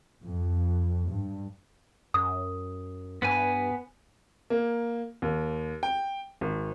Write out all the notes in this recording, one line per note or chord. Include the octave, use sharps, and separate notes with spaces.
F2
G2
F#2 D#6
G2 B3 B4 G#5
A#3
D#2
G5
G#1